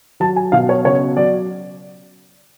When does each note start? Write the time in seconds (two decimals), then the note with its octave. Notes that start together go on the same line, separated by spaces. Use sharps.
0.20 F#3 A5
0.36 G#5
0.52 B2 F5
0.69 C#5
0.85 C#3 C#5
1.17 F#3 D5